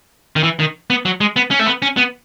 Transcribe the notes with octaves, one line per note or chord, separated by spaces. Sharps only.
D#3
E3
D#3
B3
F#3
G#3
B3
C#4
A3
B3
C#4
B3